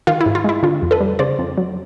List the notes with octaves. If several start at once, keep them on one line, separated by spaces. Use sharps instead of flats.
D#3 F4
E4
G#2
F4
G#3 E4
D3 F4
F2
A4 B4
G3
C#3 C5 D5
F2
F#3